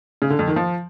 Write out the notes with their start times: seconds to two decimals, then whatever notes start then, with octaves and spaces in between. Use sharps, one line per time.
0.22 C#3
0.30 D3
0.39 F2
0.48 D#3
0.56 F3